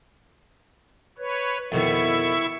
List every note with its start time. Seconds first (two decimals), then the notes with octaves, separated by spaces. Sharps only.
1.18 B4 C#5
1.72 F2 B2 D#3 E4 E5 C#6